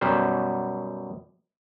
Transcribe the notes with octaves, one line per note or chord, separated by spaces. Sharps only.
F#2 B2 G3 C5